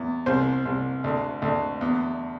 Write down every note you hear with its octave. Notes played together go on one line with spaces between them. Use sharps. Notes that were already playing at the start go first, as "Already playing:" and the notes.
Already playing: E2
C2 C5
C2
D2
D2
E2